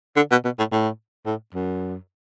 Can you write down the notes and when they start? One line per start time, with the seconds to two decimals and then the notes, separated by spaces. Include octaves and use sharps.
0.16 D3
0.31 B2
0.45 B2
0.59 A2
0.72 A2
1.26 A2
1.55 F#2